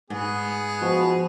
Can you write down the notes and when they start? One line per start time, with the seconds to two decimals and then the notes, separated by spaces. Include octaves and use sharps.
0.10 G#2 B3 G#4
0.82 B2 F3